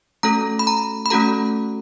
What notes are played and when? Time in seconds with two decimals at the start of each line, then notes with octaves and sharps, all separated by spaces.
0.23 A3 C#4 F#4 A4 A#5
0.59 B5
0.67 A#5
1.06 B5
1.10 A3 C#4 F#4 A4 A#5